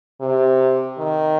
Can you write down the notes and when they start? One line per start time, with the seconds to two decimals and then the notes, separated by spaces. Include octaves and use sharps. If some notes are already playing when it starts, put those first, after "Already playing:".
0.20 C3
0.98 D#3